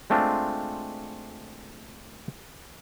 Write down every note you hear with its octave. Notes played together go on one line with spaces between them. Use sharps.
G#3 A3 C4 D4 F4